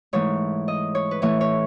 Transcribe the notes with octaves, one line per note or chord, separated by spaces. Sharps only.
G#2 E3 A3 C#5
D#5
C#5
B4
A2 E3 A3 C#5
C#5